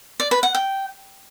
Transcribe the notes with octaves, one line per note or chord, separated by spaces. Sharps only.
D5
B4
F#5
G5